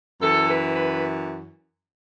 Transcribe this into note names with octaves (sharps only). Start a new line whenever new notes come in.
F#2 E3 A4
B4
B4